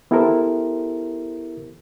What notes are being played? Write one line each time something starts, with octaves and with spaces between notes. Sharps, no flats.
B3 E4 G4 A4 A#4 C5